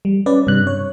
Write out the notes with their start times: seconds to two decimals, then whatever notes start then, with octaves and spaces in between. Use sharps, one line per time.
0.05 G3
0.26 C#4 B4 D5
0.47 G2 C3 F#6
0.67 C#5